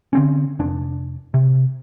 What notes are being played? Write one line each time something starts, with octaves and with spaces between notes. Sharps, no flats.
D3 C4 C#4
F1 D4
C3